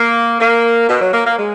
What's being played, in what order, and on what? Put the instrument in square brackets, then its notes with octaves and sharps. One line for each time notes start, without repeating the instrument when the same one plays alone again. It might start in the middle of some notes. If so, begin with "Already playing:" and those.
Already playing: [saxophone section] A#3
A#3
B2
F#3
A#3
A#3
G#3